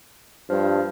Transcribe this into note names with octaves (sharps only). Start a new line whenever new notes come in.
G2 F3